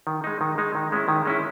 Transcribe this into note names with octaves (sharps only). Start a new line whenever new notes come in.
D#3
G#3 D#4
D#3
G#3 D#4
D#3
G#3 C#4 E4
D#3
G#3 C#4 E4